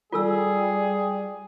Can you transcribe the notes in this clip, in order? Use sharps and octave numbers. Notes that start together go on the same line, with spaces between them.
G3 F4 G#4 A4 E6